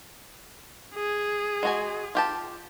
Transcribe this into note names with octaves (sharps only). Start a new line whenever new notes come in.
G#4
G#3 F#4 G#5
F4 G4 A5